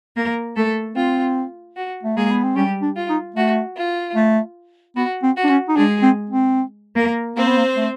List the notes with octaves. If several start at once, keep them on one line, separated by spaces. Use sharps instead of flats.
A#3 A#4
A3 A4
C4 F4
F#4
A3
G#3 A#3 G#4
B3
C4
G3 C#4 G4
D4
F4
D#4
A3 F#4
F4
A3
B3 F#4
C4
F#4
D4
C#4
D#4
G#3 D4 G#4
C4
C4
A#3 A#4
A#3 C4 C5
B3
A#3
A3